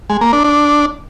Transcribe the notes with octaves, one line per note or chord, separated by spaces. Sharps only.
G#3
A#3
D4
D4